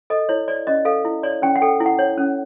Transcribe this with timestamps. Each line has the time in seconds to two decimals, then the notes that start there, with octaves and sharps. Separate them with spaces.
0.10 A4 D#5
0.29 E4 C#5
0.48 C#5 D5
0.67 C#4 D#5
0.85 A4 F5
1.05 E4
1.23 C#5 D5
1.42 C#4 G5
1.56 F#5
1.62 A4 G5
1.80 E4
1.86 F#5
1.99 C#5
2.18 C#4